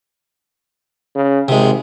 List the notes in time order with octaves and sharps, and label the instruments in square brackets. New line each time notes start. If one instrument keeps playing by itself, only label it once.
[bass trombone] C#3
[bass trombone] G#1 [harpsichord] C3 G#3